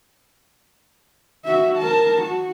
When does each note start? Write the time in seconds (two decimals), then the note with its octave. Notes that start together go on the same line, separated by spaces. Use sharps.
1.45 F#4 E5
1.78 A#4 A5
2.22 F#4